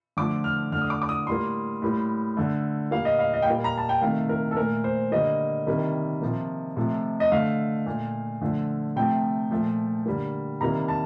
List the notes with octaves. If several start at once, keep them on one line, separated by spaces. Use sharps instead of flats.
D3 F3 A3 D6
F6
D3 A3 F6
D#6
D6
D6
D#6
A2 G3 A#3 C6
A2 G3 A#3
D3 A3
A#2 G3 A#3 F5
D#5
F5
D#5
G5
A#2 G3 A#3 F5
A#5
A5
G5
C3 D#3 A3 F5
A#4
A4
A#2 A3 A#4
C5
D3 G3 A#3 D#5
C3 D#3 G3 A#3
C3 F3 A#3
C3 F3 A3
D#5
D3 A3 F5
A#2 A3
D3 F3 A3
C3 F3 A3 G5
A#2 F3 A3
D3 G3 A#3
C3 D#3 G3 A#3 A#5
A5